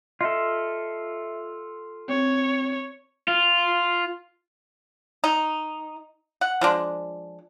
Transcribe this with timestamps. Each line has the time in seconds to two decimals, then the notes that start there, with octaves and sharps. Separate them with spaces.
0.21 F4 A4 D#5 E5
2.09 C4 C#5
3.28 F4
5.24 D#4
6.41 F#5
6.61 F3 G#3 D4